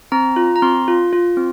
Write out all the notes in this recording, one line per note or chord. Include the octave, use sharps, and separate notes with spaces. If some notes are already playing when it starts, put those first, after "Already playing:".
C4 A#5
F4
A#5
C4 C6
F4
F4
C4